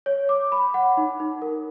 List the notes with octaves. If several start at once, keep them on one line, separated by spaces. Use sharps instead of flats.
C#5
D6
B5
F#5
D#4
D#4
A#4